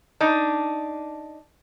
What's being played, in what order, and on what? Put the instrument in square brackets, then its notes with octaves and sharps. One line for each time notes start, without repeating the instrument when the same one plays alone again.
[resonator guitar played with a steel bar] D4 D#4